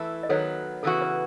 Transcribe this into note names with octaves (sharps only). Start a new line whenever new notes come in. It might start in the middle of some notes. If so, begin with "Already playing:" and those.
Already playing: E3 A3 E4
D#5
D#3 F#3 B3 A4 C#5
C#3 E3 B3 F#4 A4
B4